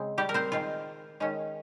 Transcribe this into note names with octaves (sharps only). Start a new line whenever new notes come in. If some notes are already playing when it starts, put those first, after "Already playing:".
Already playing: C#3 G#3 C4
G3 G4
A#4
C4 C5
D#3 G#3 C4 F4 F5
D#3 G#3 C#4